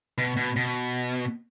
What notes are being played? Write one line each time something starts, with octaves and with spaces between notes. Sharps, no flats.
B2
B2
B2